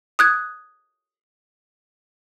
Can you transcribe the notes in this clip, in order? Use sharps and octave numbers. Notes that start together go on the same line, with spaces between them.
D#6 F#6 G#6